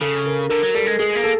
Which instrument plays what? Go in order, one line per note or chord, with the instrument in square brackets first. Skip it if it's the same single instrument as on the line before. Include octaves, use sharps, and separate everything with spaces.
[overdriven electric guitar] C#3 [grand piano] A4
[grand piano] A#4
[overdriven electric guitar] D3 [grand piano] A#4
[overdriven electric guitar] F#3
[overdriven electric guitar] G3 [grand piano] A4
[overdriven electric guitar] G#3
[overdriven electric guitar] G#3 [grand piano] G#4
[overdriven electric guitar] A#3
[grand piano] A4